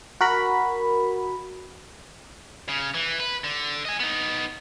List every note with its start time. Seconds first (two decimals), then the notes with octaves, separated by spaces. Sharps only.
0.21 F#4 A#4 B5
2.69 C#3
2.94 E3
3.20 B4
3.44 D3
3.85 D#5 G#5
4.00 B3 D#4